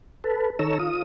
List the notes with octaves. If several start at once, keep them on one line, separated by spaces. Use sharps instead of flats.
A4 B4
D#3 A4 C#5 A#5 E6
F4 D#6